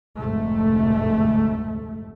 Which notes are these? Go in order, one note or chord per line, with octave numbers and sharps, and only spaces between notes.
F1 D2 G#2 A3